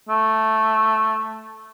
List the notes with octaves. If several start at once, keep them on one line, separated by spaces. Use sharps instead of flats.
A3